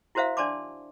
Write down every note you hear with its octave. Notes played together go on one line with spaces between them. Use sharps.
E4 F#4 A#4 C5 E5 F5
D4 D5 A5 C6 D6